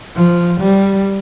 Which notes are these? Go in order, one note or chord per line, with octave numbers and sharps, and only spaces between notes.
F3
G3